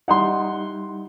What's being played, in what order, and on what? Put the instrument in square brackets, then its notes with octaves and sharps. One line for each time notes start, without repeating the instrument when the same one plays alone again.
[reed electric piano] G3 D#4 E4 [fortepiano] F#5 C6